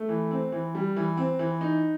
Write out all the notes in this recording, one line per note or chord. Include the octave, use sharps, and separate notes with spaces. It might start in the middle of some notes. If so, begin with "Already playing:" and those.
Already playing: A3
E3
C4
E3
G3
E3
C4
E3
D#4